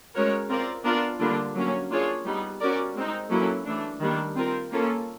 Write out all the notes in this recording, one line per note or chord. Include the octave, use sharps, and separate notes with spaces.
G#3 C#4 F#4 A#4 C#5
C4 F4 A#4 D5
B3 D4 F4 A#4 D5
D3 G3 A#3 D4 F4
F#3 A#3 C#4
A#3 D4 F4 G#4 C#5
G3 B3 D#4
C#4 F#4 A#4 D5
G#3 C4 D#4
F#3 A#3 C#4 E4 A4
E3 A3 D4
D#3 G3 A#3 D4
C4 F4 A#4
A#3 C#4 F4 A4